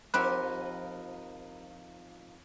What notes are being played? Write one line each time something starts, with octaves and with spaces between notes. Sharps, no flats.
F3 C4 D#4 G4 A#4 B5 F#6